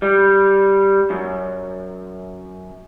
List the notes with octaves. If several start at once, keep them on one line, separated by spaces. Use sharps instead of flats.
G3
F#2